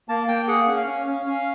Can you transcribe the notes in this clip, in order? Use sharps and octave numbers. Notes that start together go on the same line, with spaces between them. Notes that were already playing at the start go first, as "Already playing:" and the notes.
A#3 A5
A#3 G5
G#4 F#5
C#4
F5
C#4
C#4
C#4